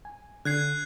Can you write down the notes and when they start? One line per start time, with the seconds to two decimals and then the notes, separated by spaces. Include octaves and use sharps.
0.05 G#5
0.45 D3 F#6 G#6 C7